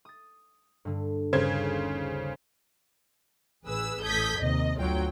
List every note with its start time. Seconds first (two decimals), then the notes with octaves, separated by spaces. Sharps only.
0.05 D#6 A6
0.85 G2 D3
1.33 G1 D#2 C#3 A#4 C5 G#6
3.65 A1 G#4 B4 E6
4.02 A1 A4 D#6 G6 G#6 B6
4.39 D#2 C3 D#5
4.79 G1 D2 F#3 F4 G5